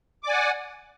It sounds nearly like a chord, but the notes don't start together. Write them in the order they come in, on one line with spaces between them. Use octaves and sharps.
D6 D5 G#5 F#5